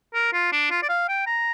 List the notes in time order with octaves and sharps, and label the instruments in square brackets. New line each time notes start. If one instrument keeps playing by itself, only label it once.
[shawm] A#4
F4
D4
F4
D5
F5
G5
A#5